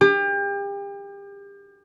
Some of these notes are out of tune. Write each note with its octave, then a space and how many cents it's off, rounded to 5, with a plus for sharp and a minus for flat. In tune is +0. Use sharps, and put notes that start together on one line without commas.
G4 +35